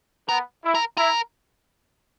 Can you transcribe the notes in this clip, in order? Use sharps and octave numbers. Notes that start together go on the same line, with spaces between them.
B3 A#4
E4
A#4
E4 A#4